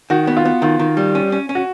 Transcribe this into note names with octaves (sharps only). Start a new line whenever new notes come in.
D#3 F#4
B3
F4
B3
D#3 F4
D#3
G3
C#4
C#4
C#4
F#4